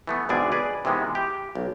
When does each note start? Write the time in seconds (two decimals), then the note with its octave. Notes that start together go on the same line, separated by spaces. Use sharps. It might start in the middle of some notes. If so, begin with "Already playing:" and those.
0.07 E3 A3 B3
0.29 G#1 B2 D3 G#4 D5 G#5
0.52 G#4 B4 D5
0.85 C3 D#3 E3 G#3 B3
1.15 G4
1.55 B1